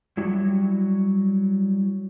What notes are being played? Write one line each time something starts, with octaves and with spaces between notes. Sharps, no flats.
F#3 G3 E4 F#4